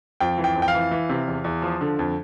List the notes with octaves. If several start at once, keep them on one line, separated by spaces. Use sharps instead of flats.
F2 G5
E3
G5
F2
G5
F5
E3
E3
C3
E2
E2
F3
D3
F2